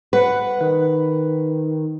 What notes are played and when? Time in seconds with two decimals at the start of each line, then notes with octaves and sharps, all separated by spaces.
0.13 B4 F#5
0.61 D#3